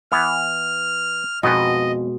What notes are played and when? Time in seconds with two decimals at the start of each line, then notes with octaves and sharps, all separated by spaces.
0.12 E3 B3 F6
1.43 F2 B2 G#3 B3 D#4 D#5